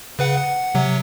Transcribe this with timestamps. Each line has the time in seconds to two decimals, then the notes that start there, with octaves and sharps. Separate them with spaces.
0.19 C#3 B4 F#5
0.37 F#5
0.75 C3 F#3